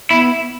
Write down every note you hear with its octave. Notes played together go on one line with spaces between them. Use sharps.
B3 E4